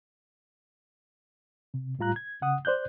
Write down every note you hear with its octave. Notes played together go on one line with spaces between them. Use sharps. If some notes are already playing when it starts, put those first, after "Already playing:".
C3
A2 G3 F4 A#5 F#6
G#6
C#3 F#5 D#6
C5 D5 F#6 G6